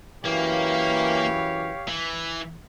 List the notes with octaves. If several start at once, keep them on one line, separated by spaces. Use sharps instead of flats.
F#2 E3 A#3 G4 C#5 F5
E3